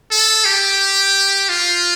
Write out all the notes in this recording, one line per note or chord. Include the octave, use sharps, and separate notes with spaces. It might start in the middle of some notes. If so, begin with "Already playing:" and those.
A4
G4
F4